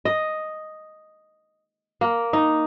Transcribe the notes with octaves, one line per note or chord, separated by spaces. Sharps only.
D#5
A#3
D#4